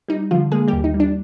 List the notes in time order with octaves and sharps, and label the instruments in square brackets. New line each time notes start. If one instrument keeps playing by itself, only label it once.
[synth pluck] G3 D#4
D3 F3 F4
G#3 A#3 G#4
G3 G4
D#2
D#4
G3
D4